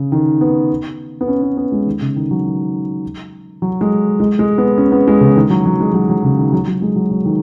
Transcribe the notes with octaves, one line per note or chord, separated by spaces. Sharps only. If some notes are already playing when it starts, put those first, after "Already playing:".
Already playing: C#3
D#3
B3
B3
C#4
B3
B3
G#3
D#3
C#3
D#3
F#3
D#3
F#3
G#3
G#3
G#3
B3
C#4
B3
G#3
C#3
D#3
F#3
F#3
G#3
F#3
F#3
C#3
D#3
F#3
F#3
G#3
F#3
F#3
D#3